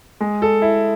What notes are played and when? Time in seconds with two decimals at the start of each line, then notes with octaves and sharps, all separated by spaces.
0.20 G#3
0.42 A4
0.62 E4